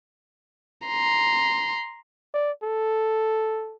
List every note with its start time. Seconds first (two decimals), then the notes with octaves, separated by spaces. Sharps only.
0.87 A#5 C6
2.34 D5
2.63 A4